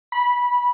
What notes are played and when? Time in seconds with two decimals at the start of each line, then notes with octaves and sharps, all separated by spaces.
0.12 B5